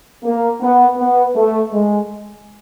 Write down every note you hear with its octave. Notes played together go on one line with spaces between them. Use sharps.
A#3
B3
B3
A3
G#3